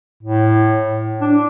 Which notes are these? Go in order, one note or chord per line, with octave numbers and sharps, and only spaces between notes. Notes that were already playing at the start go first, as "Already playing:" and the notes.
A2
D4